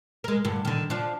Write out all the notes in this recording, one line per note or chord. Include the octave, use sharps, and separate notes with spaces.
G#3 A#4
G2 D3
D3 D#3
F3 D4